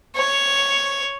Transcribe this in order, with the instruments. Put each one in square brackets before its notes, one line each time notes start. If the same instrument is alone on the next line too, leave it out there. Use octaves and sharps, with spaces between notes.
[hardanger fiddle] C#5